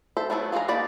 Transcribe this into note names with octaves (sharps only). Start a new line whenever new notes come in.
A4 C5 E5
F#3 A3 B3 D4 E4
F3 G#3 F#4 G#4 A#5
A#3 D#4 D5 B5